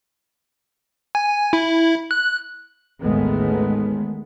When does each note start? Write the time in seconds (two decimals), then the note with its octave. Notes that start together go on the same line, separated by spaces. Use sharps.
1.15 G#5
1.53 E4
2.11 F#6
3.04 A1 D#2 D#3 G#3 A3 B3